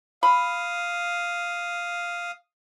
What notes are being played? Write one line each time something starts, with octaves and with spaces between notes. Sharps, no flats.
F5 B5 D#6